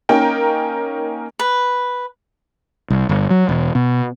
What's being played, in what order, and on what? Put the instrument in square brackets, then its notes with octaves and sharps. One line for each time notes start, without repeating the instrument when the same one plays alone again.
[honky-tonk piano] A#3 C#4 D#4 A#4 G5
[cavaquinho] B4
[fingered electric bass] C2
G1
F#3
E1
B2